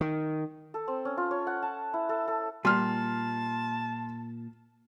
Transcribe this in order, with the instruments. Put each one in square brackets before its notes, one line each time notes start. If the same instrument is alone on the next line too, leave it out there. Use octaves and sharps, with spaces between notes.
[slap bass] D#3
[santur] A4
C4
C#4
F4
C#5
F#5
A5
E4
A4
A4
[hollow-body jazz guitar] A#2 [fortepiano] G3 [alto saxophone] A5 [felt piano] C6 F6